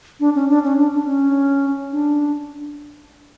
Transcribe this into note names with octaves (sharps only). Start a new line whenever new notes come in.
D4
C#4
D4
C#4
D4
D4
C#4
D4